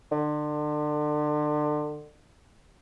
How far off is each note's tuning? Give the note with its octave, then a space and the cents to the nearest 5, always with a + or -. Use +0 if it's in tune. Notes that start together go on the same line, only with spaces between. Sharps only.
D3 +30